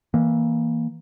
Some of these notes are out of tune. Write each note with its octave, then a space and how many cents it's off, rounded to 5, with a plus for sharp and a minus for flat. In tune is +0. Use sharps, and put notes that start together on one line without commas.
E3 -15 A#3 +0